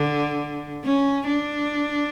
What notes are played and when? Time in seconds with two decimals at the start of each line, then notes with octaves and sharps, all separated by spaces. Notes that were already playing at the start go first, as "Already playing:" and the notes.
Already playing: D3
0.85 C#4
1.27 D4